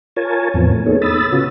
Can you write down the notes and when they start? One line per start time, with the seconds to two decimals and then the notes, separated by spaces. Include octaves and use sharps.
0.16 F4 A#4 C#5 G#5 A5
0.54 E2 A2 E3 F3 B3 C4
0.72 A3
0.86 A#3 B3 D#4 G#4 A4 C#5
1.02 B5 D#6 E6 A6
1.32 C#3 B3 C#4 F4 F#4